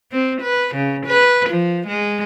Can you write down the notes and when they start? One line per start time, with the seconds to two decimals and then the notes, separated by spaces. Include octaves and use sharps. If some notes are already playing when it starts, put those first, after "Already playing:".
0.12 C4
0.42 B4
0.75 C#3
1.07 B4
1.50 F3
1.87 G#3